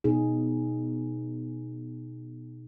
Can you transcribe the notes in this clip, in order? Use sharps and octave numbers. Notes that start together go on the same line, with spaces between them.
B2 D#4 G#4